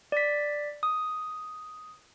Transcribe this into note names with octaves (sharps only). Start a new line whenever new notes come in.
D5 B6
D#6